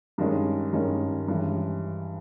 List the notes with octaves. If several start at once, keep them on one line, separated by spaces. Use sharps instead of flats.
G2 D#3 G#3 C#4
G2 D#3 G#3 C#4
G2 E3 G#3 C#4